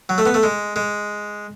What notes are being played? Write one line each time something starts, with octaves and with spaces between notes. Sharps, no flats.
F#3
A3
B3
A3
G#3
G#3